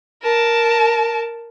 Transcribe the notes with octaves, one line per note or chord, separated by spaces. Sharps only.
A#4 A5